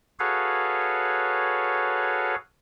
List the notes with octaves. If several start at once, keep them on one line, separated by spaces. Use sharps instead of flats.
F#4 G#4 A4 B4 C#5 F5